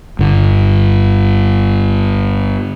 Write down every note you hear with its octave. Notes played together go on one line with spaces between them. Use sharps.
G1 D3